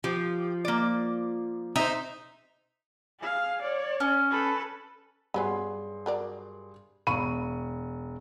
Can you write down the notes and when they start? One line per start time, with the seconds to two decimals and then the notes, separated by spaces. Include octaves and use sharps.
0.04 F3 G4
0.65 A#3 D5
1.76 D#4 C5 E5
3.20 G#4 F5
3.62 C#5 D5
4.00 C#4
4.30 A4 B4
5.34 G2 F#3 B3 C#4 G#4 C6
6.06 F#3 A#4 D5
7.07 E1 F5 B5 C#6 D#7